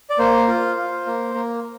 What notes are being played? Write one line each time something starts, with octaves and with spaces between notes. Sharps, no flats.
D5
A#3 C5
F4
F4
A#3
A#3